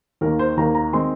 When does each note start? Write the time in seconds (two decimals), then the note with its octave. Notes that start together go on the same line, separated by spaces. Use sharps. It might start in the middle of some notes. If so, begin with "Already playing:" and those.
0.21 D#2 D#3 A#3 A#4
0.39 C5
0.57 D#2 D#3 A#3 A#5
0.75 A#5
0.93 D#3 G#3 C4 C6